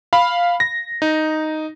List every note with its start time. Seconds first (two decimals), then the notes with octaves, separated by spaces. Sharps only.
0.13 F5 B5
0.60 A#6
1.02 D#4